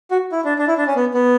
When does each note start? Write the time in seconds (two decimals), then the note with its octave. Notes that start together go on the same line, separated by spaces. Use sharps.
0.11 F#4
0.32 E4
0.45 D4
0.58 D4
0.67 E4
0.78 D4
0.87 C#4
0.96 B3
1.14 B3